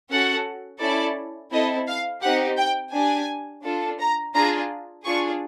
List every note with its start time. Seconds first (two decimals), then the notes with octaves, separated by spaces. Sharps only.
0.11 C#4 F#4 A4 F#5
0.81 C#4 E4 A4 D5
1.52 C4 E4 A4 D#5
1.87 F5
2.22 C4 D#4 G4 F#5
2.58 G5
2.93 D4 G4 G#5
3.64 D4 F4 A4
3.99 A#5
4.34 D4 F4 G#4 A#5
5.05 D4 F4 G#4 C#6